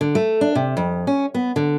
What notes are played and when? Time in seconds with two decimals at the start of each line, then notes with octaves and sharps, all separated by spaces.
0.01 D3
0.15 A3
0.41 D4
0.55 C3
0.77 F2
1.07 C#4
1.34 B3
1.56 D3